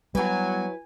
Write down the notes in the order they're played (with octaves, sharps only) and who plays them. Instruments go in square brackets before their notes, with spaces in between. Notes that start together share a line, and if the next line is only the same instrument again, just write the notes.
[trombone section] F#3 [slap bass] G3 A3 B3 [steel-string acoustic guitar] E4 B4 [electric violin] G#5